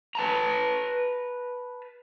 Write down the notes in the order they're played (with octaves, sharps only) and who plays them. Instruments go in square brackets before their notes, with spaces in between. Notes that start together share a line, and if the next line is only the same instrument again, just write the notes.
[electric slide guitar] B4 A5 A#5